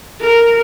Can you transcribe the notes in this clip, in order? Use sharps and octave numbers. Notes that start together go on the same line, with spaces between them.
A#4